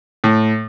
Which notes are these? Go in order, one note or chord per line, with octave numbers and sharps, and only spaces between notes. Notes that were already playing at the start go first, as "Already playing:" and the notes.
A2